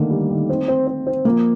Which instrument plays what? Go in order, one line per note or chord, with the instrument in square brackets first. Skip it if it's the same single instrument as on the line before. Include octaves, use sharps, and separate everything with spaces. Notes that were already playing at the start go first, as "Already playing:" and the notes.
Already playing: [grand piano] D3 D#3 A#3 [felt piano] A3
[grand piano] G3
D#3
C4
C4
C4
C4
[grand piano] F3 [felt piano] A#3